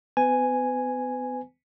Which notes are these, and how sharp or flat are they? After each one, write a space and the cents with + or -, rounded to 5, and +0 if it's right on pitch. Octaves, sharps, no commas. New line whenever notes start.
B3 +40 B4 +40 G#5 +0